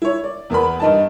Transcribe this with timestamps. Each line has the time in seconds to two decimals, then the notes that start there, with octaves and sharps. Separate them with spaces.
0.02 E4 C#5
0.24 D5
0.50 E2 B3 A#4 B5
0.80 G2 D#4 A5